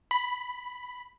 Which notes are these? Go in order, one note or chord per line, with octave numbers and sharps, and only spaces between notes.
B5